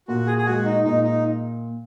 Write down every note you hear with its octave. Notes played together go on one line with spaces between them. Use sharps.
A#2 F#4
G#4
G#4
G#3 F#4
D#4
A#2 D#4
D#4